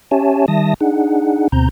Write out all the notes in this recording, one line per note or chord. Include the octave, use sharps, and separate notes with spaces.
C#4 G4 C#5 E5 G#5 A5
D#3 G3 E5 A5 D#6 A#6
D4 D#4 G#4 F#5
D2 B2 C4 A#5 G6